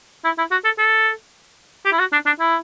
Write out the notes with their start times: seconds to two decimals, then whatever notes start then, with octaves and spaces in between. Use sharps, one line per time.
0.25 E4
0.38 E4
0.51 F#4
0.65 A4
0.78 A4
1.85 G4
1.92 E4
1.99 F#4
2.12 D4
2.26 D4
2.40 E4